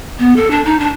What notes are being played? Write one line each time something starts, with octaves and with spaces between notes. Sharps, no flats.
B3
A4
D4
D#4
D4